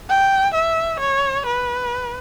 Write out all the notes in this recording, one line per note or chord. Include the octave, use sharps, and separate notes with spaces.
G5
E5
C#5
B4